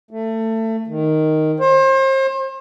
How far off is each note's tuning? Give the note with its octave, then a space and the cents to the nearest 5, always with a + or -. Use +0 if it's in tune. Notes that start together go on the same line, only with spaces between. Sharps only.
A3 +25
D#3 +0
C5 +35